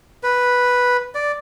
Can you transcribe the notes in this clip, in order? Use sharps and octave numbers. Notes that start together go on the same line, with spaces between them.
B4
D5